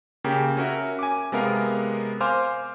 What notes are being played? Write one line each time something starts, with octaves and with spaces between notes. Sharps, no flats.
C#3 A#3 G4 A#4
C#4 F#4 A#4 E5
G#5 D6
C3 G#3 B3 A#4 F5 A#5
C5 F5 G#5 C6 D6 F6